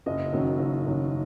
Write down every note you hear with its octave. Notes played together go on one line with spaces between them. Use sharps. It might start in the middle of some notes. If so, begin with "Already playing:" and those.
F#1 D#5
F#2 D#3 F#3
F#1
F#2 D#3 F#3